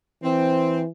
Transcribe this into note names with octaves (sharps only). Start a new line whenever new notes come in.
E3 C4